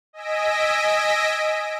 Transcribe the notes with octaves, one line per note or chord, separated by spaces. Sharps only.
D#5 G#5 E6 A#6 B6 D7